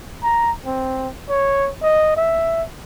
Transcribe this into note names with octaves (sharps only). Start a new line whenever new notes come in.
A#5
C4
C#5
D#5
E5